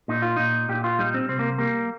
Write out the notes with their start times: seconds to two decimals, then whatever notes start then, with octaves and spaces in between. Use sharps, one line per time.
0.08 A#2 D#4
0.22 F4
0.36 A#2 D#4
0.69 A#2 G4
0.84 F4
0.99 G3 D#4
1.14 C4
1.29 C3 C4
1.39 A#3
1.58 G3 A#3